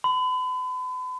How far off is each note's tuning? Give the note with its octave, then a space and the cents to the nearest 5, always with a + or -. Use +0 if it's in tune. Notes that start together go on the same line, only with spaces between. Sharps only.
B5 +40